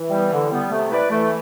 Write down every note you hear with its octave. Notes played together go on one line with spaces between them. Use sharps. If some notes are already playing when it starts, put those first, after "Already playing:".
Already playing: E3
G3 B3
D3
G3 B3
C3 A3
E4 B4 D5
E3 A3